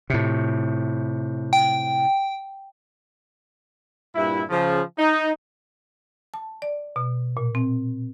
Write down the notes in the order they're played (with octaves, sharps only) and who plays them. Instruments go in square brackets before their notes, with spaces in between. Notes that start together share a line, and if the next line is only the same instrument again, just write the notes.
[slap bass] A2 C3
[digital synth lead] G5
[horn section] G2 A#2 E4
C#3 F3
D#4
[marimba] A5
D5
B2
A#2
C4